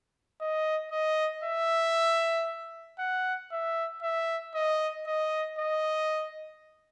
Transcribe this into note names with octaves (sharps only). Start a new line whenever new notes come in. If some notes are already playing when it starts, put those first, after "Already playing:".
D#5
D#5
E5
F#5
E5
E5
D#5
D#5
D#5